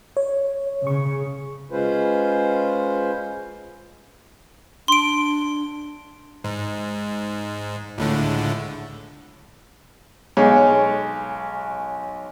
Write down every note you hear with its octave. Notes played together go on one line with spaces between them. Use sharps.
C#5
C#3 C#6
G#3 C#4 F4 B4 C5
D4 C6 D7
G#2
C#2 A2 D3
B1 G#3 G#4 C#5